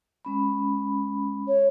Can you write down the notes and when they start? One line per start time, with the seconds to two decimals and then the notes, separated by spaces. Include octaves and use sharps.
0.25 G#3 C#4 B5
1.48 C#5